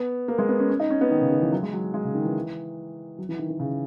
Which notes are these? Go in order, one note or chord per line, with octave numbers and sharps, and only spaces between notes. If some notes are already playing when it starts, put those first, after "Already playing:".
Already playing: B3
A#3
G#3
B3
C#4
C#4
D#4
C#4
B3
D#3
C#3
D#3
E3
F#3
G#3
F#3
G#3
C#3
D#3
E3
F#3
E3
D#3
D#3
C#3